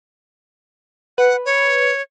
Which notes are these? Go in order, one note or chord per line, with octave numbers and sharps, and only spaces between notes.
B4 F#5
C#5